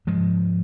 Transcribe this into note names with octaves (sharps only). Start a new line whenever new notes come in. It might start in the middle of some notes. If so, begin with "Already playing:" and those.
G#2 F3 G#3